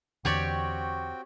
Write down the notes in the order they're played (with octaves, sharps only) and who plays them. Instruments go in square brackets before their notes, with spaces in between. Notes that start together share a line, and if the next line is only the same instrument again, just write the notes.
[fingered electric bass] E2 D3 [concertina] C4 F#4 G5 [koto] G4 C#5 D5